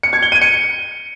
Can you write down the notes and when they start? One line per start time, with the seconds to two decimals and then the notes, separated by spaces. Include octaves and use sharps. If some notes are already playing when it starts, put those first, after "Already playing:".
0.03 C#7
0.13 G#6
0.23 G7
0.32 D#7
0.42 C#7